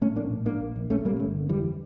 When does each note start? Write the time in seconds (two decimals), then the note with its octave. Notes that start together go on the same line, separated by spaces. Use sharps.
0.01 A2 A3 C#4
0.16 A#1 A#3 D4
0.31 A2
0.45 A#1 A#3 D4
0.60 A#1
0.76 A#1
0.90 A#1 A3 C#4
1.05 A#1 G3 A#3
1.19 G1 A3 C#4
1.35 D3
1.49 F2 E3 G3